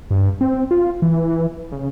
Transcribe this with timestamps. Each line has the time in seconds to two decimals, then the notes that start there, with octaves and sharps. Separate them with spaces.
0.11 G2
0.41 C4
0.71 F4
1.02 E3
1.72 C#3